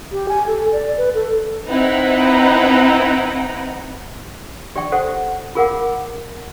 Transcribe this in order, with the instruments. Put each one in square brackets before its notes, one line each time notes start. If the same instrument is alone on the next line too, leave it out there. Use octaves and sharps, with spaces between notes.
[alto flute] G4
G#5
A4
D5
B4
A4
[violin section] C4 D#4 E4 B4 F#5 A#5
[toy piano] G4 D5 E5 G5 C#6
A4 C5 E5 F#5
F4 G#4 A#4 F5 F#5 D6